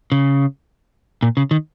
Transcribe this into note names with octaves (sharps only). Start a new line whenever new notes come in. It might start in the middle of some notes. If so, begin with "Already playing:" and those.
C#3
A#2
C#3
D#3